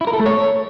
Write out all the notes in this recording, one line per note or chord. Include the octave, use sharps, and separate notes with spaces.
E4
A#4
A4
A3
C#5